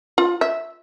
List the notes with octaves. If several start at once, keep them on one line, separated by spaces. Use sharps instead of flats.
F4
E5